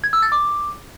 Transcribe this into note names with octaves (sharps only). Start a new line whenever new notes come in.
G#6
E6
A6
D6